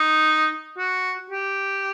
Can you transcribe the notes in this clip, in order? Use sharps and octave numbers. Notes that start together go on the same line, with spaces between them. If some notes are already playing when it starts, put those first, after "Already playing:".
Already playing: D#4
F#4
G4